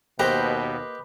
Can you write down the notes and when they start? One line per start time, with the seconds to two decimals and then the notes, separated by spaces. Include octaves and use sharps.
0.19 D#2 B2 A#3 G4 B4 C5 D#5